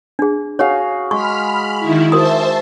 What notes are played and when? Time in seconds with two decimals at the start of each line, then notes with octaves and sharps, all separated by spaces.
0.19 D4 G#4
0.59 F#4 G#4 C#5 F5
1.11 G#3 B5 C#6 F6
1.79 D#3 E4
2.12 F#4 A#4 C5 E5 A5 D#6